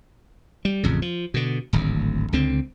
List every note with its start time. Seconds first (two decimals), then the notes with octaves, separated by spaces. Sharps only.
0.65 G3
0.84 A1 F2 C#3
1.02 F3
1.34 B2 D3
1.73 D1 G#1 D2
2.32 C#2 D3 C4